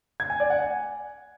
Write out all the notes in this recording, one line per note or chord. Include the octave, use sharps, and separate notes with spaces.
G#6
G#5
D5
F#5
G#5